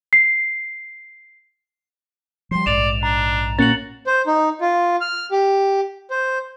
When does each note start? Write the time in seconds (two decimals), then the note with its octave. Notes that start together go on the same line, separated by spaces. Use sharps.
0.13 C7
2.51 F3 G3 C6
2.66 A#1 G#2 D5 E7 F7
3.03 D4 A#5
3.59 A#2 A#3 C#4 F#4 A6 C#7 F#7
4.07 C5
4.27 D#4
4.61 F4
5.01 F6
5.31 G4
6.10 C5